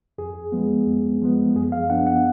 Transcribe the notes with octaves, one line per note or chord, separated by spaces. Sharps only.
F2 G#4
F3 G#3 B3
F2
F3 G#3 B3
F#2 G#4
F5
F3 B3 D4 F#5
F#5